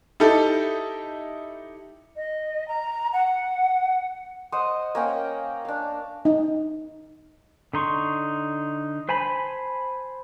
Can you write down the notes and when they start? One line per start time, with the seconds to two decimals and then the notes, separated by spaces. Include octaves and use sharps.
0.20 D#4 E4 G4 A4
2.16 D#5
2.68 A#5
3.13 F#5
4.52 C5 D#5 F#5 D#6
4.95 A#3 C#4 G5
5.65 D4 F5
6.25 D#4
7.74 D3 D#4 C6 C#6
9.09 C5 G#5 A5 B5